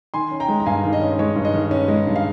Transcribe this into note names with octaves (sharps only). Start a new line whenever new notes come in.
D#3 G#5 C6
C#4
G5 A#5
G#3
A#5
G2 F5 G#5
D#3
D#5
C#4
G#3 C#5
G2
D#5
D#3
C#4
G#3
G2
F5